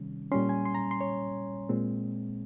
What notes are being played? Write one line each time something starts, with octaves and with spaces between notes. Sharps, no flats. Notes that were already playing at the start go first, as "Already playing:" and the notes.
Already playing: C3 D#3 G3 C#4
A#2 G3 C#4 C6
G#5
C6
A#5
C6
C#5
A#2 G#3 C4